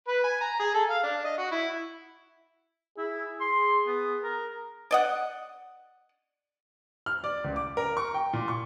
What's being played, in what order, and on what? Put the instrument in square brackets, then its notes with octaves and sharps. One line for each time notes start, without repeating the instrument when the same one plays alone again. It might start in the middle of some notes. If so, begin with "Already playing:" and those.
[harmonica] B4
G#5
A#5
G#4
A4
F5
D4
D#5
F#4
E4
[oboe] E4 [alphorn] G#4
[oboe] C6
B3
A#4
[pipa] D5 D#5 F#5
[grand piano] F6
D5
C#2
D6
A#4
C#6
G5
A#2
C#6